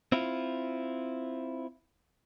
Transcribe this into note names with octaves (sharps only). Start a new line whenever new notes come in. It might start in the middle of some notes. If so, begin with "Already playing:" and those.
C4 E4 F4